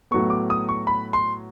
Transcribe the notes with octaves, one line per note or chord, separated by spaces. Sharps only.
A2 F#3 B3 C#6
D6
D#6
C#6
B5
C6